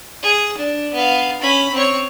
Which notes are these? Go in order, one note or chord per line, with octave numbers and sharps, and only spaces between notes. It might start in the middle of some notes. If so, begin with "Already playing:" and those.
G#4
D4
B3 F5
C#4 B5
C4 C#5